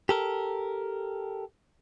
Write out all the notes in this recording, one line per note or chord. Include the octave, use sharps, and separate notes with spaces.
G4 A4 A#4